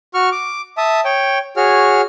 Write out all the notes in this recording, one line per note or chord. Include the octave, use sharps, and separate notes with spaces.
F#4 C#6 F6
D6
E5 A5 D#6
C#5 G5
F#4 G#4 C#5 F6